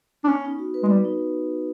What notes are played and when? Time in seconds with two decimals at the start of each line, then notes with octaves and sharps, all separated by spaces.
0.24 D4
0.28 B3 C#4
0.45 D#4
0.59 F#4
0.74 B4
0.83 G#3
0.89 G3 B3
1.05 D#4